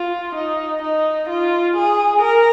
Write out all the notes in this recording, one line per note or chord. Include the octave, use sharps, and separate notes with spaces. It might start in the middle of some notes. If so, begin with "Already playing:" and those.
Already playing: F4
D#4
D#4
F4
G#4
A#4